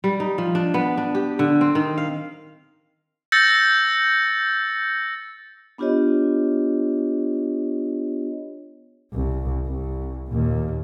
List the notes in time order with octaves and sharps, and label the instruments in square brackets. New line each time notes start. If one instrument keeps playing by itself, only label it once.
[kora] G3
D#4
F3
D4
B3
D4
G4
D3
C4
D#3
F5
[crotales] E6 G6 A6 A#6 C#7
[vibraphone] B3 D4 F4 G4 C#5 D#5
[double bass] C2
C2
D#2 A#2